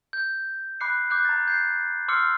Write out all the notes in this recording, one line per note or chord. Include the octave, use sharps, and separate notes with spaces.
G6
B5 D6 F#6 C7 C#7
D6 F#6 G6
A#5 A6
G6 A6 C7
C6 D6 E6 F6 C7 C#7